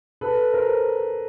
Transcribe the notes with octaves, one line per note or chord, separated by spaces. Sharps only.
A4 B4
A#4 C5